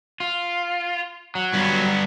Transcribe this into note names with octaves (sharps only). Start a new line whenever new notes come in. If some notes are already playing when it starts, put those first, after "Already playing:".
F4
F#3
G2 B3